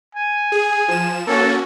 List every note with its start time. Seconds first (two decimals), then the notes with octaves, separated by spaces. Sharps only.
0.15 G#5
0.52 G#4
0.88 F3 E7
1.27 A#3 C#4 F#4 A4